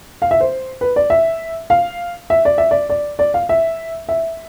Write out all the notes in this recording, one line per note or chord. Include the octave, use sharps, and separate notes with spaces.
F5
E5
C5
B4
D5
E5
F5
E5
D5
E5
D5
D5
D5
F5
E5
E5